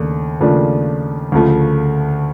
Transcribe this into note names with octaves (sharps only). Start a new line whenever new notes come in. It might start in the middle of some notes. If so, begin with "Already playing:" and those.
Already playing: D#2 C#3 A3 D4
D#2 C#3 F3 A3 D4
D2 C#3 F3 A3